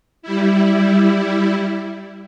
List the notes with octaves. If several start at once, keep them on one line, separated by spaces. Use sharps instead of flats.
G3 E4